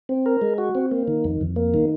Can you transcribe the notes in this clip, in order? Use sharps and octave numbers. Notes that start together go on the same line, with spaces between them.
C4
A#4
G#3
F#4
C4
A#3
D#3
F2
F2
A#3
D#3